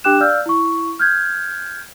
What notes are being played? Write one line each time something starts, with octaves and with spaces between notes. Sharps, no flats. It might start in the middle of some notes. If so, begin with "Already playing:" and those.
D4 G4 G5 D6 F#6 E7
D5 F5 E6 F6 G6
E4 C#6
F6 G6 G#6